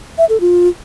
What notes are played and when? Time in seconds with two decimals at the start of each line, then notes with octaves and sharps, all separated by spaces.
0.18 E5
0.29 A4
0.40 F4